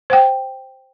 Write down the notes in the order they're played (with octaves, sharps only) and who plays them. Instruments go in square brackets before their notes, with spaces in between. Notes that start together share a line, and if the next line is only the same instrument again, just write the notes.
[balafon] C5 F#5 G5